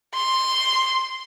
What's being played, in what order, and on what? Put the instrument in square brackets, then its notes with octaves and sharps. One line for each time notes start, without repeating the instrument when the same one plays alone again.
[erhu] C6